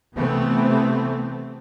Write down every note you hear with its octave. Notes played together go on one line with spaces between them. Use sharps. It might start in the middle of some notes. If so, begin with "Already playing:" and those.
C3 E3 A3 B3 C4